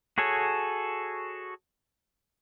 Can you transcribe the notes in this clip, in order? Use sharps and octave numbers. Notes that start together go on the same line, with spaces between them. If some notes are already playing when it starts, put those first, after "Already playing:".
F#4 G#4 A4 C#5